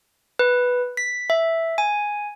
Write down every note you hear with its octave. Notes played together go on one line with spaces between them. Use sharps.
B4
B6
E5
G#5